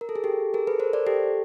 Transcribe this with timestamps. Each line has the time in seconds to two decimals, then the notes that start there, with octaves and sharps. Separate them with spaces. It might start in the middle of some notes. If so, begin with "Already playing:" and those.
0.01 A#4
0.09 A4
0.16 G#4
0.24 G4 A4
0.54 G#4 A#4
0.67 A4 B4
0.80 A#4 C5
0.93 C5 D5
1.07 G4 A4